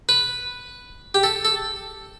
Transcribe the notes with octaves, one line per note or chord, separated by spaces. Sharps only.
B4
G4
A4
A4